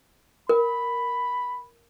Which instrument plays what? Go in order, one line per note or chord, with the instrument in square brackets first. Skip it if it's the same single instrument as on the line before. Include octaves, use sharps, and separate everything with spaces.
[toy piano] A#4 [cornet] B5